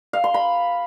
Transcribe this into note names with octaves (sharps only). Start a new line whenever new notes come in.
F5
C6
B5